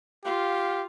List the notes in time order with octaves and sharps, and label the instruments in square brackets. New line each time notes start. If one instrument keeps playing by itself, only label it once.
[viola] F4 [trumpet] G4 [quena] F5